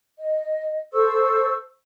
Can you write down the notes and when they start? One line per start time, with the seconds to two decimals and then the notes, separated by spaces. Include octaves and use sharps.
0.18 D#5
0.92 A4 C5 C#6 E6